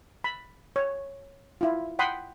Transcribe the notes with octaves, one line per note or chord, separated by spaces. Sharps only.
B5
C#5
E4 F4
F#5 G5 B5 C6 D#6